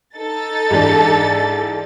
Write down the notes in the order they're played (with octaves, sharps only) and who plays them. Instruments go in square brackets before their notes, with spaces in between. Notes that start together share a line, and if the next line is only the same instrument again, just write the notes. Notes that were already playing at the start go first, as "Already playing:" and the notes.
[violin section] D#4 A4 A6
[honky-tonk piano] G#2 E3 D4